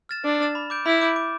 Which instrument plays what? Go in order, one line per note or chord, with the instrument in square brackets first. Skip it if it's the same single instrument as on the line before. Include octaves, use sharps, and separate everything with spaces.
[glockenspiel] F6 A6 E7
[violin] D4 [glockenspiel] D6
[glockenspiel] F6 A6 E7
B5
D6 G6 D7
[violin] E4 [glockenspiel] B5
[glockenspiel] D6 G6 D7
D6